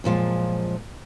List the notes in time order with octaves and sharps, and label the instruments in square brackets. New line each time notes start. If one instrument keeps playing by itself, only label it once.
[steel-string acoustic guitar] F#2 A#2 F3 G#3